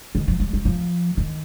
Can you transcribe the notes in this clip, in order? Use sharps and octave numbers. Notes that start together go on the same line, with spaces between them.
D#3
F3
G3
G3
F3
D#3